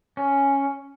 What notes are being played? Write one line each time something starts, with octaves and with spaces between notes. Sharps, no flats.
C#4